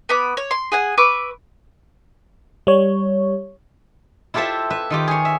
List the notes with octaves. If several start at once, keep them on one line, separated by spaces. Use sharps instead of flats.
B3 B5 D6
C#5
C6
G#4 F#5 G#5
B4 C#6 D6 E6
G3 C#5
E4 F4 G4 A4 C5 E5
B4 E5
D#3 F4 G4
G#4 C#5
E5